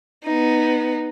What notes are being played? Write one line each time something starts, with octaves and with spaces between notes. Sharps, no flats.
B3 D#4